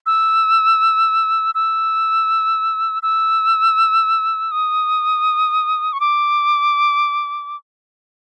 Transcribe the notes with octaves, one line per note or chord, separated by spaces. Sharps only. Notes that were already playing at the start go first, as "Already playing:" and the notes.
E6
E6
E6
D#6
C#6
D6